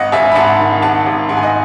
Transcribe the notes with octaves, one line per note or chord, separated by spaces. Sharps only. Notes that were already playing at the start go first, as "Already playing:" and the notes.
Already playing: G#1 D#5 F#5
G#1 E5 G#5
B5
G#2 F#5 A5
D#3
G#1 F#5 A5
G#1
G#2 F#5
G#5
D#5 F#5